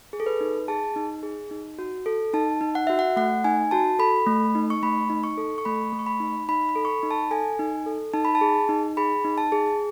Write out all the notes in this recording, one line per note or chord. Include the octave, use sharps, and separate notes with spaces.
G#4
A4
B4
D#4
G#4 A5
D#4
G#4
D#4
F#4
A4
D#4 A5
D#4
F#5
F#4 E5
F#5
A3 F#5
D#4 G#5
F#4 A5
A4 B5
A3
D#4
C#6
A3 B5
D#4
C#6
A4
C#6
A3 B5
A3
C#6
B5
D#4
D#4 B5
B5
A4
C#6
B5
D#4
A5
A4 G#5
D#4
A4
D#4 A5
B5
A5
G#4
D#4
G#4 B5
D#4
A5
G#4